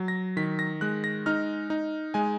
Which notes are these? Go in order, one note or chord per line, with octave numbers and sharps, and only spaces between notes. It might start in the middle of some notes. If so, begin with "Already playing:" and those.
Already playing: F#3
A#6
D#3 B6
A#6
G#3 F#6
A#6
D#4 F6
D#4
G#3 G#5